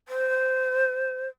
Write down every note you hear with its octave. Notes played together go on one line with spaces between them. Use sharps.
C5